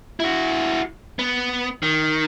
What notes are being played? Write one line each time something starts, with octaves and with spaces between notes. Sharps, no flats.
E4 F#4
B3
D#3